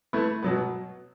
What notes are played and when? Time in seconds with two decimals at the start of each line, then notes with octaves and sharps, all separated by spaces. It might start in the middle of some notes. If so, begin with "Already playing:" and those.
0.13 A3 E4 B4
0.42 B2 F#3 B3